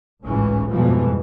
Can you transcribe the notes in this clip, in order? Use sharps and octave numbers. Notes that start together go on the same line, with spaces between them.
G#1 C#2 A2 E3 C#4
F2 G#2 B2 E3 F3 G3